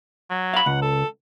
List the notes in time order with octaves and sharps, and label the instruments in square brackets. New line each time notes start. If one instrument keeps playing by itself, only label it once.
[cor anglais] F#3
[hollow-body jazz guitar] F5 B5
[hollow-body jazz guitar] C#2 [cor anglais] F#5
[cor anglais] A4